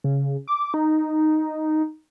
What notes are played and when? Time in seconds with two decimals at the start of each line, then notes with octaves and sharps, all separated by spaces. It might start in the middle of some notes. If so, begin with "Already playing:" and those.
0.04 C#3
0.48 D6
0.74 D#4